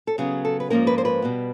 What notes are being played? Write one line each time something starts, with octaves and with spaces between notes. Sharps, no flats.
A4
C#3 F#3 B3 G#4
A4
B4
G#2 F3 A#3 C#4 A#4
B4
C5
B4
B2 G3 B3